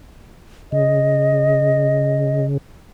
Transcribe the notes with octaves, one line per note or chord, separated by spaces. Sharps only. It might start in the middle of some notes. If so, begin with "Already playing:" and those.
C#3 D#5